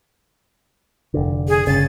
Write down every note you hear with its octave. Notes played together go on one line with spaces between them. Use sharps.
F1 D3
G#4
G1 C#3 A6